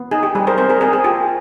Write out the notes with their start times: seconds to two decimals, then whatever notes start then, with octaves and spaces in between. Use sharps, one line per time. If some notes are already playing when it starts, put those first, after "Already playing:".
Already playing: B3
0.11 D#4 G#4
0.23 G4
0.35 G3 G#4
0.47 A#4 C5
0.58 C4 A#4 C5
0.70 G#4 A#4
0.81 C4 G#4 A#4
0.93 G#4
1.04 F4 G4